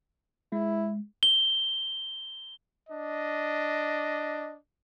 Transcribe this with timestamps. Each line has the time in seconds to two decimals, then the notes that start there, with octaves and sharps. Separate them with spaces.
0.52 G#3 E4
1.23 G7
2.89 D4 D#5